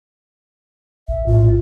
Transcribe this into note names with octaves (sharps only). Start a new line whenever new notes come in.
A#1 E5
A2 F4